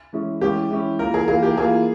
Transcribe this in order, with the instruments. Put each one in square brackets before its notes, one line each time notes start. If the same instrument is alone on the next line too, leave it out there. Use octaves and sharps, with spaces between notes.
[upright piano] E3 G#3 C#4 E4
[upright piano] E3 G#3 C#4 E4 [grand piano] G4
[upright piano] E3 G#3 C#4 E4
[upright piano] E3 A#3 F4 [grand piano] A#4
[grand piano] G#4
[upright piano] E3 A#3 F4 [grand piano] G#4
[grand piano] G4
[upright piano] E3 A#3 F4 [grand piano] G#4